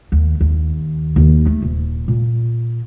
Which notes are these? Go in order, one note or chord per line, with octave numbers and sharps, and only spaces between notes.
D#2
D#2
D#2
A3
D#1
A#2